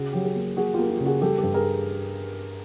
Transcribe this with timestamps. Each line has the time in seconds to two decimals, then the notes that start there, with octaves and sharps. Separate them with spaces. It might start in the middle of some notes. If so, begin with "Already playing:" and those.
Already playing: C#3 F#4 G#4
0.13 F#3 G4
0.24 F#4 G#4
0.36 A#3
0.57 A#3 F#4 G#4
0.74 A#3 F4 G4
0.89 F4 G4
1.00 C#3
1.06 F#4 G#4
1.21 G3 G4 A4
1.38 G4 A4
1.43 G2
1.54 G#4 A#4